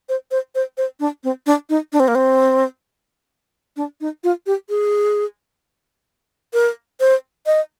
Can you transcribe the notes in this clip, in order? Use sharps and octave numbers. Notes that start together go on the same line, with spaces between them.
C5
C5
C5
C5
D4
C4
D4
D#4
D4
C4
A#3
C4
D4
D#4
F4
G4
G#4
A#4
C5
D#5